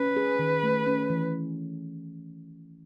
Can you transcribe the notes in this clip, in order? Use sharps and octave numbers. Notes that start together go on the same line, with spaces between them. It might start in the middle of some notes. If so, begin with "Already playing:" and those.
Already playing: C#4 B4
G#4
D#3
A3
C#4
E3